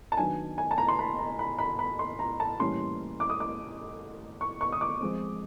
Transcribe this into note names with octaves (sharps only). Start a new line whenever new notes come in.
A5
D#3 F#3 B3 D4 G#5
G#5
A5
A#5
C6
B5
A#5
B5
B5
B5
C6
A#5
A5
A2 E3 G3 A#3 C#4 C6
D6
D#6
D6
C#6
C#6
D#6
D6
F3 G#3 C4